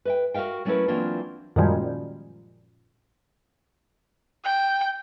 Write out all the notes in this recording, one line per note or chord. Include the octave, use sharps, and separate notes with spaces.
B4 E5 G5
F#4 A#4 E5 F5 G5
F#3 A3 C#4 E4 A#4 B4
E3 F#3 A#3 C4 D4 F4
F#2 A#2 D#3 F3 G3 G#3
G5